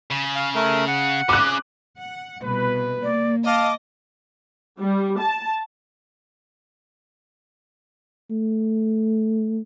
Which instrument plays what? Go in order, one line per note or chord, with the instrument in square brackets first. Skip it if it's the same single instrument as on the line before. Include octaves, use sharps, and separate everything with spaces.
[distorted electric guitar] C#3
[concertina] F5
A3 A#4
F#5
[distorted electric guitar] C#3 [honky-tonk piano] D6 F#6
[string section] F#5
[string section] C2 B2 [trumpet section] B4
[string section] A#3 [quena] D5
[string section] D#5 [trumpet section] F5 A5 [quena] D6
[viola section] G3
A5
[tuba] A3